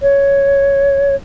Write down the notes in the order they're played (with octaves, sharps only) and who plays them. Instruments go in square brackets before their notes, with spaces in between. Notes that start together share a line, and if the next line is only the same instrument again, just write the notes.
[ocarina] C#5